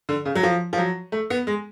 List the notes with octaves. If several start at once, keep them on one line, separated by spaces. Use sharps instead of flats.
D3
C#3
F#3
F3
F3
F#3
A3
B3
G#3